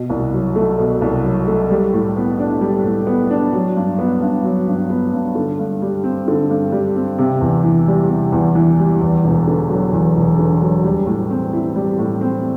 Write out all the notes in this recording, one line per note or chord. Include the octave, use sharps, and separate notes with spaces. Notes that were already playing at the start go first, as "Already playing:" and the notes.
Already playing: B2
C2
F#3
A3
B2
C2
F#3
A3
G3
A2
B3
D4
G3
A2
B3
D4
F#3
G2
B3
G2
F#3
G2
B3
G2
D3
G2
G3
C4
D3
G2
G3
C4
C3
E2
E3
G3
C3
E2
E3
G3
E2
E1
D3
F#3
E2
E1
D3
F#3
G3
A2
C4
E4
G3
A2
C4